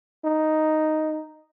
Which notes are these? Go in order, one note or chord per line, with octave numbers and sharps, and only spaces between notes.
D#4